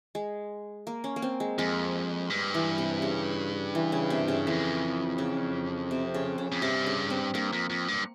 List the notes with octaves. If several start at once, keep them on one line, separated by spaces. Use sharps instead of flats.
G#3
A#3
C#4
A#3
C4
G#3
F2 G#3
G2
E3
C3
C#3
E3
C#3
C3
C#3
F2 E3
C#3
C3
C#3
C#3
F2
G2 C3
C#3
C4
G2 A#3
F2
F2
G2